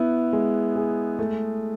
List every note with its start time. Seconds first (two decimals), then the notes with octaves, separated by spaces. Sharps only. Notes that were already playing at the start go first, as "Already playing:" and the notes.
Already playing: B3 E4
0.33 G#3
0.75 G#4
1.19 A3